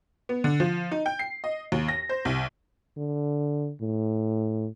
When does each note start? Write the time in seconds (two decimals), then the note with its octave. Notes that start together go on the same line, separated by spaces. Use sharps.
0.29 B3
0.44 D3
0.60 F3
0.91 D#4
1.06 G5
1.19 C7
1.44 D#5
1.72 D#2
1.88 A#6
2.09 C5
2.25 C2
2.97 D3
3.81 A2